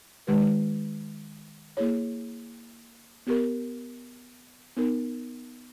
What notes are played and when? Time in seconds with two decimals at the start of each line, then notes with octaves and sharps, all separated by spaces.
0.27 D#3 G#3 D#4 G4 B4
1.77 A#3 E4 G#4 C#5
3.27 B3 G4 A#4
4.77 B3 D#4 A#4